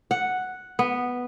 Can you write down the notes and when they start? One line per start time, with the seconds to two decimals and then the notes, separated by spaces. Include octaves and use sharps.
0.11 F#5
0.79 B3